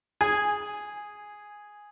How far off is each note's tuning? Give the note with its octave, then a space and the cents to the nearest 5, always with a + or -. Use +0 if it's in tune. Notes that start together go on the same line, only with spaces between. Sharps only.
G#4 +0 G#5 -10